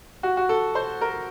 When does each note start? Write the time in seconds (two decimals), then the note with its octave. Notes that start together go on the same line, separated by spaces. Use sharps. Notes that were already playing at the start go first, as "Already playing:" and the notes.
0.23 F#4
0.37 F#4
0.49 A4
0.75 C5
1.01 A#4